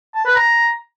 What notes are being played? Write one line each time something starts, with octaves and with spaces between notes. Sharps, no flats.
A5
B4
A#5